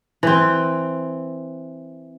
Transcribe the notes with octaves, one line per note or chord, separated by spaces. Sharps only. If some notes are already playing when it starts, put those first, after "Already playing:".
E3 C4